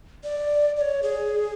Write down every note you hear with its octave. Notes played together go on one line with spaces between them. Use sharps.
D5
D5
C#5
G#4